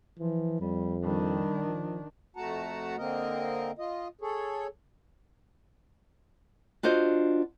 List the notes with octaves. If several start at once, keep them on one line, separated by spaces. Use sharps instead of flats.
E3 F3
F2 G3
D#3 G3 D4
F3
F2 A3 F#4 F#5 A5 A#5
D3 A#3 C4 A#4 D#5
F4 D#5
G#4 A4 C#5
D4 F4 F#4 C5 D#5